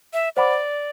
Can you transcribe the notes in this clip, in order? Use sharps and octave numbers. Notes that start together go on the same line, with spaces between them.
E5
C5 D5 F#5 B5 D6